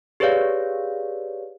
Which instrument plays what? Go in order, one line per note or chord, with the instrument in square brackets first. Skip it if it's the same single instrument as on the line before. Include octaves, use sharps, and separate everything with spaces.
[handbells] G4 G#4 B4 C#5 D5 F5